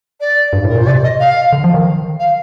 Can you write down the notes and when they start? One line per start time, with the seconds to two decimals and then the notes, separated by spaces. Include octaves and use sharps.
0.20 D5
0.53 G2
0.65 A2
0.69 A#4
0.75 A#2
0.78 C5
0.86 C3 D5
1.03 D#5
1.20 F5
1.53 D3
1.64 F3
1.74 D#3
2.19 F5